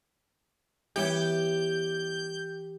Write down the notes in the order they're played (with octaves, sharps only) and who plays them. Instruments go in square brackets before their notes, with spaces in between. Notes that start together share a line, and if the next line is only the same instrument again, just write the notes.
[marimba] E3 C#5 G#6 [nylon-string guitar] G3 B3 E4 [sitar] G4 [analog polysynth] G6